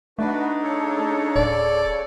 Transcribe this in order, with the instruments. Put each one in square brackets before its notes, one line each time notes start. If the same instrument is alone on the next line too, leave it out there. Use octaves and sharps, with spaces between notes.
[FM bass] A3 [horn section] D4 D#4 [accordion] F#4 B4
[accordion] C#3 A4 C#5
[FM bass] D1 [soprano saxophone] D5